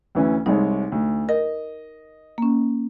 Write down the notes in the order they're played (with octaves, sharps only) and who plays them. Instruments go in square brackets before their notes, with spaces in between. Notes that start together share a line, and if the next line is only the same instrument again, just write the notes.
[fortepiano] D2 E3 C#4
[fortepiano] C2 G#3 C#5 [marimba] D#4
[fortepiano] D2
[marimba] A#4 [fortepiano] D#5
[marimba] A#3 C#4